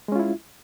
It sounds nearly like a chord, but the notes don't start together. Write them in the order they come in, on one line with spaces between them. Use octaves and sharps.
G#3 C#4 F4 E4